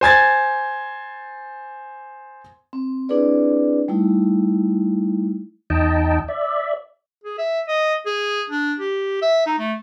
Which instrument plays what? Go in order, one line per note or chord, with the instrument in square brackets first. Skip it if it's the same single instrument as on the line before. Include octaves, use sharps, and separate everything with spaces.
[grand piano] C5 G#5 G#6 A6
[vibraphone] C4
C4 D4 E4 G#4 B4 D5
G3 A3 D#4 E4
[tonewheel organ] E2 D#4 D#5 G5 A5
D5 E5
[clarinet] G#4
E5
D#5
G#4
D4
G4
E5
D#4
A3